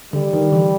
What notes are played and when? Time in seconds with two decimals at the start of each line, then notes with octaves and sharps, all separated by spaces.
0.13 D3 G3
0.33 D#3
0.52 D3 E3